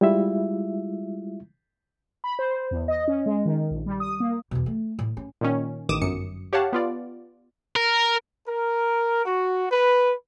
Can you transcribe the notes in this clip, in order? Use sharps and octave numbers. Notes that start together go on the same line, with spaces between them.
G3 G#3 E4 F4 E5
B5
C5
E2
D#5
C#4
G#3
D#3
A#1
G3
D#6
A#3
E2 B2
A3
A2
C#4
A#2 D#3 C#4
A1 D#3 D6 D#6 E7
G1 F#2 C#7
G4 C#5 F5 F#5 A5
B3 F4 D5
A#4
A#4
F#4
B4